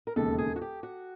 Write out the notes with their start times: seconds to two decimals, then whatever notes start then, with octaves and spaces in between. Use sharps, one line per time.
0.07 A#4
0.16 E1 D#2 C#3 A4
0.38 G#4
0.56 F#4
0.61 G4
0.83 F#4